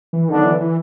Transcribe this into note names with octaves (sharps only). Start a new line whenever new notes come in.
E3
D3 D#3 F#3 B3 D4
E3
E3